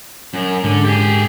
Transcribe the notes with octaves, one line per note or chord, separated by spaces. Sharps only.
F#2
G#2 D3
G4 G#4